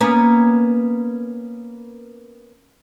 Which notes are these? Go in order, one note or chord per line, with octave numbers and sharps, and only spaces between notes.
A#3 B3 C#4